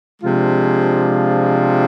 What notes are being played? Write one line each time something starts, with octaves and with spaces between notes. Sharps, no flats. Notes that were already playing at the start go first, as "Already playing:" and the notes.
C3 F3 G#3 D4 F4